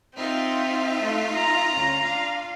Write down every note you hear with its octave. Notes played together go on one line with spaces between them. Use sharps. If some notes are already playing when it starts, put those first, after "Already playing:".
C4 D#4 F4 E5
A3
A#5
D2 C#4
D4 F5